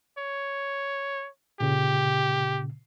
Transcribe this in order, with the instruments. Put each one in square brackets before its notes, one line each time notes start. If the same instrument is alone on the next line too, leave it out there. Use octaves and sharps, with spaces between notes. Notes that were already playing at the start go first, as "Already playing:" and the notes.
[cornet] C#5
[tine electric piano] A#2 C#3 [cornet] G4